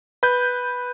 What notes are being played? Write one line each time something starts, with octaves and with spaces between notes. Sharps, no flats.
B4 G6